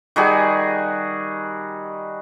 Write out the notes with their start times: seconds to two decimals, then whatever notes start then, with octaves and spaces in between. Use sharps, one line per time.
0.16 D#3 G3 F#4 G#4